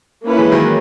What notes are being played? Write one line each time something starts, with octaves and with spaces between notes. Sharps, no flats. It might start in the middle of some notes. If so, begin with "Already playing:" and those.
A#3 C#4 E4 B4
E3 G#3
D#3 F#3